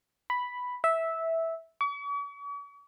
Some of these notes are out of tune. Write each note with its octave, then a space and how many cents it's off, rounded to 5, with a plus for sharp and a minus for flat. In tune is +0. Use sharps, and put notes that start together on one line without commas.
B5 +0
E5 -10
C#6 +45